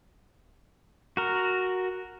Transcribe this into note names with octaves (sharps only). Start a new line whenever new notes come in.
F#4 A#4